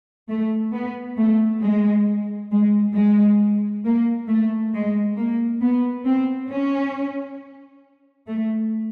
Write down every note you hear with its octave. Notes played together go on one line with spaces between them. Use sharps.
A3
B3
A3
G#3
G#3
G#3
A#3
A3
G#3
A#3
B3
C4
C#4
A3